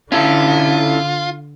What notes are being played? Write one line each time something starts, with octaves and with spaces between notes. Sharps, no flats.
D3 C#4 E4 F4 A4